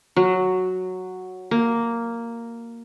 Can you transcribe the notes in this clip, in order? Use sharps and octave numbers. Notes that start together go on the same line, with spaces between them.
F#3
A#3